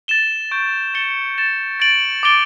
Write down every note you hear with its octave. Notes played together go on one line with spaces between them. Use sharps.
A6 E7 G7
C#6 G6 D7
A6 C#7 E7 G7
A6 E7 G7
A6 D7 F#7
D6 A6 D7 G7